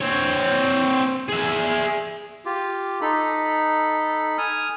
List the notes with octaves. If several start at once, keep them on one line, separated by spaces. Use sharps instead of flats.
C4 C#5
G#4 E5
F4 G4
D#4 A4 B5
G#5 D#6 F6